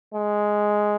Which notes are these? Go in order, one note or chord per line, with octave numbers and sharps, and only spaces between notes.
G#3